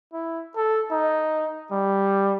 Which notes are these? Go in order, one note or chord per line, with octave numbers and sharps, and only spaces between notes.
E4
A4
D#4
G3